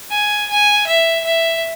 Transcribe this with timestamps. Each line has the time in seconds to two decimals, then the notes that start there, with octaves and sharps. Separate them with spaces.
0.11 G#5
0.50 G#5
0.87 E5
1.24 E5